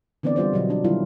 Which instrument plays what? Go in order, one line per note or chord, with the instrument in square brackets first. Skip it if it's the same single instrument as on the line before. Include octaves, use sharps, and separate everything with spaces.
[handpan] D3 E3 B3 C4 D5
G3 F4 C5 D5
B2 D3 F#3 D#5
D3 D4
D#3 F#3 G3 E4 F4